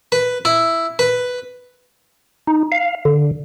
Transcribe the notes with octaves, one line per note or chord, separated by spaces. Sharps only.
B4
E4
B4
D#4
F5
D3